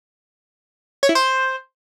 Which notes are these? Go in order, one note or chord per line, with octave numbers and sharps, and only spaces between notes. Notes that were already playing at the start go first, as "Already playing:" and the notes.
C#5
E4
C5